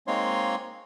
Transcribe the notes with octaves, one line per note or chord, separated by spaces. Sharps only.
G#3 A#3 C4 D#4 C#5 C6